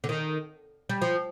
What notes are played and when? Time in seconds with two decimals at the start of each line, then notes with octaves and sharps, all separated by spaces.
0.04 D3
0.09 D#3
0.89 G3
1.02 F3